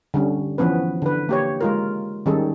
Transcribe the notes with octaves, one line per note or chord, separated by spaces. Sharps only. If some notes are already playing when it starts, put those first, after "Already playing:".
D3 G3 C#4
E3 F3 B3 C#4 B4
D3 B4
A#3 G4 C#5
G#3 F4 A#4
D#3 G3 C#4 D#4 G#4 A4